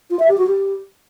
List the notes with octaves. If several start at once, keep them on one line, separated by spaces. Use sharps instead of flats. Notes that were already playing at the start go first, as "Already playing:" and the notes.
F4
E5
G4
F#4
G4